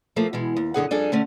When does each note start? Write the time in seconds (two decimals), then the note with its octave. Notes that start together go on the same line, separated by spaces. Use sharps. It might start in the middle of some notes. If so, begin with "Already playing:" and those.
0.16 F3 A3 A#3
0.33 B2 E3 G#3
0.56 D#2
0.74 F#2 D3 G#4 F#5
0.91 F2 G3 D4 G#4 A4 G#5
1.12 D3 A3 C#4